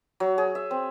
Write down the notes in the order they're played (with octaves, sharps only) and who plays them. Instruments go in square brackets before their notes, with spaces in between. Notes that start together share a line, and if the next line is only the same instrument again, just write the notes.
[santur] F#3
G#4
E5
C4